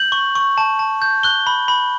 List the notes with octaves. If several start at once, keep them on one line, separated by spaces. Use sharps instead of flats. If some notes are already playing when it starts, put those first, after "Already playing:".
Already playing: G6 F#7
C#6
C#6
A5
A5
G6
F#6 G7
B5
B5